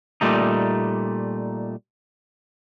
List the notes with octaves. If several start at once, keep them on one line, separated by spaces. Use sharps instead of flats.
A#2 G3 A3 D#4